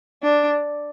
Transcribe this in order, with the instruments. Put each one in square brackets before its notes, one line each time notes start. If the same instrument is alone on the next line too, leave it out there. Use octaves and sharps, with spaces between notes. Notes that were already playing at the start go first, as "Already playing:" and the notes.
[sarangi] D4